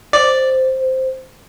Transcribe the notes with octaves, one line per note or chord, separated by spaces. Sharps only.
C5 D5